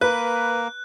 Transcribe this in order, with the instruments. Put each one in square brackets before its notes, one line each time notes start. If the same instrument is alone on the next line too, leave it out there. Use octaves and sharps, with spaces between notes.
[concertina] A#3 [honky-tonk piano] B4 [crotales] F#6